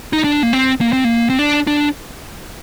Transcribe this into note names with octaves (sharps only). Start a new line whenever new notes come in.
D#4
D4
A#3
C4
A#3
C4
A#3
C4
D4
D4